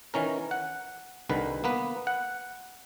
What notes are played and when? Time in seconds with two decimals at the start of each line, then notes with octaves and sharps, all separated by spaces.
0.14 D#3 E3 C#4 A#4
0.51 F#5
1.29 C2 D3 D#3 B4
1.64 A#3 B3 B4
2.07 F#5